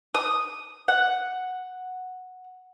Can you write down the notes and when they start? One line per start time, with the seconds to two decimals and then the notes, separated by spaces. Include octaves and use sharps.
0.15 D#6
0.88 F#5